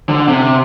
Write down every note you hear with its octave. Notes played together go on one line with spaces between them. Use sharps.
D3
C3